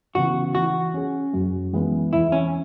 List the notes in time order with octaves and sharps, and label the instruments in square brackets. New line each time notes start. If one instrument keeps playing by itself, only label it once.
[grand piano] C#3 E3 B3 [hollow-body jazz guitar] F#4
[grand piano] E3 [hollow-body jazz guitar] F#4
[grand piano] C#4 G#4
F#2
E3 G#3 B3 E4
[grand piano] E2 [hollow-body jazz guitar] E4
[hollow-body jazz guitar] C#4